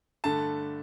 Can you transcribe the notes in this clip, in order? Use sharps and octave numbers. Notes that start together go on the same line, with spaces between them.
G2 D3 A3 A5